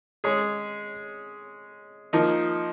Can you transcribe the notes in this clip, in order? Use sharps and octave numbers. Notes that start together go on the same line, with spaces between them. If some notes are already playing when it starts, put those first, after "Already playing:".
G#3 C#4 G#4 C#5
F3 A#3 D#4